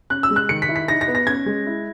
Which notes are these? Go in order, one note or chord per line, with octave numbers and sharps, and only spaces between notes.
C#4 F#6
E6
G#3
F#6
D#3 C#7
B6
E4
B6
D#4 A#6
A#6
B3
A#6
C#4 G#6
G#3
E4